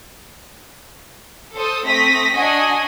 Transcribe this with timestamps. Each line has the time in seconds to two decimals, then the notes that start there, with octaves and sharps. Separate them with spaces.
1.54 A4 C5 A5 D#6
1.86 A3 C4 D#6 A#6 B6
2.34 D4 F#4 D#5 G#5